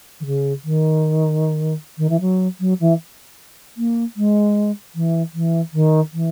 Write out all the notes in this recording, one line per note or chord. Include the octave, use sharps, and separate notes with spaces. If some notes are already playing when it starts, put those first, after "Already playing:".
D#3
C#3
D#3
D#3
E3
F#3
F#3
E3
A#3
G#3
E3
E3
D#3
E3